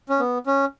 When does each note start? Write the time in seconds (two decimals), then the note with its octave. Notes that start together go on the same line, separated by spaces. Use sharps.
0.09 C#4
0.20 B3
0.47 C#4